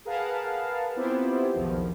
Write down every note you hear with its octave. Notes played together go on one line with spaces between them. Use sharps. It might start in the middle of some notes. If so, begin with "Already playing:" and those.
G#4 A#4 B4 F5 F#5 A5
B3 C4 E4 F4 G4 C5
B1 E2 D#3 F3